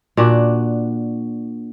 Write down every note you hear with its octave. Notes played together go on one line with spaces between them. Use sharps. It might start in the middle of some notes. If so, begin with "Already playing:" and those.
A#2 D4 F#4